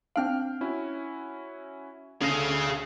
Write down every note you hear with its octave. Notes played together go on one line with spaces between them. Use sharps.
C4 D4 F5 G5 F6 D7
C#4 E4 F#4
D2 A3 C#4 G#4 F5 A#6 D#7